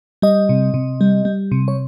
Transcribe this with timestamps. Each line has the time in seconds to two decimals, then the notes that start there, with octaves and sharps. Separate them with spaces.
0.22 G3 D#5
0.49 C3
0.74 C3
1.01 G3
1.25 G3
1.52 C3
1.68 C#5